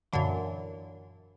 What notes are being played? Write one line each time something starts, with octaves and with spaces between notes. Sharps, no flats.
F#2 A#2 D3 E3